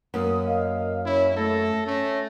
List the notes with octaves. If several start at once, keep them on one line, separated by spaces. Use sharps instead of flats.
F#2 A#3 D#6
D#5 F5
C#4 E4 C#5
A3 A4 A#6
A3 C#4